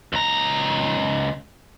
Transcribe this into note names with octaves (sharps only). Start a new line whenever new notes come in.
C#2 A#5